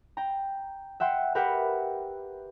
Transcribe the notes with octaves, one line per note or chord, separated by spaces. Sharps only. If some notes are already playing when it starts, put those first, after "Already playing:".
G5 A#5
E5 F#5 G5 C6
G4 A#4 B4 E5 F#5 G5